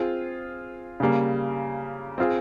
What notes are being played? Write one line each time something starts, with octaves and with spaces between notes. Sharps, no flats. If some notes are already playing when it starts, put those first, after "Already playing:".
Already playing: C4 F4 G#4
C#3 G3 A#3
C4 F4 G#4